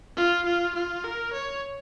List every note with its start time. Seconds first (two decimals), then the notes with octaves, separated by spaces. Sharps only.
0.16 F4
0.46 F4
0.75 F4
1.04 A#4
1.33 C#5